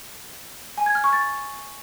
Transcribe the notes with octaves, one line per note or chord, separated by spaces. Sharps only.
G#5
G#6
F6
C#6
A6